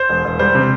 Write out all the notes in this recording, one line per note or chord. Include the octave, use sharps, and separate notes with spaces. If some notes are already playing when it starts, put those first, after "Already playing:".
Already playing: C5
E1
E1
G3 C5
C3